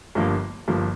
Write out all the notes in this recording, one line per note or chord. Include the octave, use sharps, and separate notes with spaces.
G1 G2 F3 A#3
G1 G2 F3 A#3